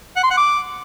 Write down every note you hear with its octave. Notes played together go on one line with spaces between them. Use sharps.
F#5
C6
F#5
D6